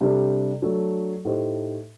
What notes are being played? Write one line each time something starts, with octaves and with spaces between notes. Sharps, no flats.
C3 G3 D4 A4
F#3 A3 D4 A4
A2 A3 D#4 G4 C5